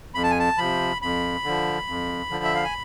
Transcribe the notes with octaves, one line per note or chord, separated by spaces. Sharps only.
F2 B5
A5
G#5
A5
C3 F3 B5
F2 B5
D3 F3
F2
D3 F3
E5
F5
G#5